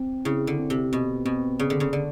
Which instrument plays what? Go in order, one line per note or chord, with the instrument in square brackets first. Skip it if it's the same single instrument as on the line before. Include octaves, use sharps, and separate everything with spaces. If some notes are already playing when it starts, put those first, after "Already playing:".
Already playing: [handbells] C4
[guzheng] C#3 [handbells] E4
[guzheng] D3
[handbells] C4
[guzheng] C3
[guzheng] B2 [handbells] C4
[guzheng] B2 [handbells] C4
[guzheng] C#3 [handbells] D5
[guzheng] D3
C#3
[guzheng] D3 [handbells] D5